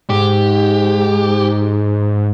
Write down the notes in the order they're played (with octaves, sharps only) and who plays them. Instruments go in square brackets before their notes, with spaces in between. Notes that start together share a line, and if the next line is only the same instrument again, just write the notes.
[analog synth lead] G#2 [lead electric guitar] G4